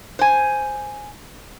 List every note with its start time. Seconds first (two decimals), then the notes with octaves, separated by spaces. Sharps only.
0.19 C5 G#5